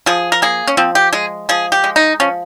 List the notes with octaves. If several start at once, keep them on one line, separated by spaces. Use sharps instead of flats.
F3 G#4
A#4
A#3 G#4
C#4
F3 C4
G4
G#3 G#4
F3 G#4
G4
G#3
D#4
F3 C#4